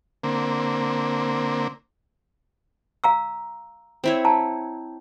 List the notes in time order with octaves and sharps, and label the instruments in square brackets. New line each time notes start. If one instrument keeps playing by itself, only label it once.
[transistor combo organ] D3 A#3 C4
[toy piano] F5 A#5 E6
[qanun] C4 E4 C#5
[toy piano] A5 A#5